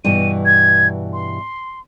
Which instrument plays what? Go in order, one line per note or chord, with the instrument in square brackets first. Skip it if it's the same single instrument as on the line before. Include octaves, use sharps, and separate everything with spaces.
[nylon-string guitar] G2 B2 E3 [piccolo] D#7
[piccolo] G#6
C6